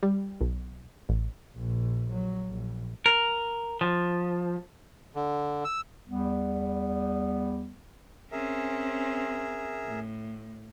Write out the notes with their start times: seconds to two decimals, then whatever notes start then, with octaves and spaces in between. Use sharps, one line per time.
0.03 G3
0.40 B1
1.09 A1
1.55 A#1 A#2
2.10 F#3
2.49 A#1
3.06 A#4
3.81 F3
5.15 D3
5.65 E6
6.09 E2 G3 B3
8.32 C4 C#4 G#4 A#4 E5
9.86 A2